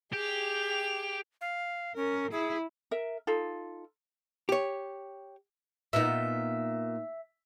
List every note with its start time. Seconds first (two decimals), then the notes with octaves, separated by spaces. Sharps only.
0.13 G4 G#4 F7
1.41 F5
1.96 C#4 A#4
2.32 E4 G#4
2.91 A#4 E5
3.27 D#4 F4 A4
4.49 G4 C#5
5.93 A#2 B3 D#4 E5